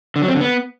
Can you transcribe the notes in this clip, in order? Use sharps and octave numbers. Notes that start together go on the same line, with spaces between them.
D3
F#3
C4
D3
B3